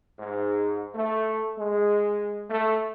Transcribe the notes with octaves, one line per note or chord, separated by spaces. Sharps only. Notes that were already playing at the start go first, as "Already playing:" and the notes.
G#2
A3
G#3
A3